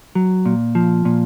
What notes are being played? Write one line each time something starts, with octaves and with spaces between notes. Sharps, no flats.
F#3
A#2
F3
A#2